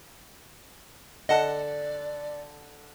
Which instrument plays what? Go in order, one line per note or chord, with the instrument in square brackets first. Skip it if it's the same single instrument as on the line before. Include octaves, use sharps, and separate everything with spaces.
[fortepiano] D3 A4 F#6 [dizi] D5 [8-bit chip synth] D#5 F#5 A5